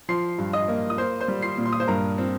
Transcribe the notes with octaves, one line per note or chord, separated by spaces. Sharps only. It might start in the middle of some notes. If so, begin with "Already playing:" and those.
F3 C6 C7
G2
D#5 D#6
A#3
D#6
A#3 C5 C6
C5 C6
G3
C6 C7
A#2
C6
D#6
C5 C6
G2 A#4 A#5
C4